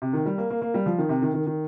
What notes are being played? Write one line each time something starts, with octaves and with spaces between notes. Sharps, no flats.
C3
D#3
G3
A#3
A#3
A#3
G3
F3
D#3
C3
D#3
D#3
D#3